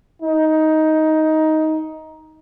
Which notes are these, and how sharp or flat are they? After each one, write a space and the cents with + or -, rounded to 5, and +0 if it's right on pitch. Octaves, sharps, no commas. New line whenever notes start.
D#4 +10